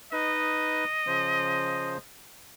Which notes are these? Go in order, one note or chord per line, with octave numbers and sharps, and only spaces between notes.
D#4 B4 D#5
C#3 F3 C5